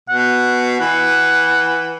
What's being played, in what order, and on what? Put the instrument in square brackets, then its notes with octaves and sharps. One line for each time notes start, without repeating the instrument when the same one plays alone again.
[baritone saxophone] B2 [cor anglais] F#5
[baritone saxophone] E3 [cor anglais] F#5